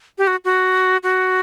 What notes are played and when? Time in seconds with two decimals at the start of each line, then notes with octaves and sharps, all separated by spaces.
0.18 G4
0.27 F#4
0.45 F#4
1.03 F#4